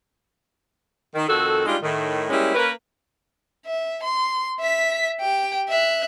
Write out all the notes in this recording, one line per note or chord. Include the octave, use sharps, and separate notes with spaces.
D#3
F2 D#3 F#4 A4
G3 G#3 D4 D#4 F4
A2 D#3
G3 G#3 A#3 C#4 E4
A#3 C#4 A#4 B4
E5
C6
E5 B6
G4 G5
E5 F#6